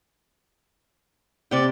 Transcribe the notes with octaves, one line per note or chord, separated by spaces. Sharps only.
C3 D5 G5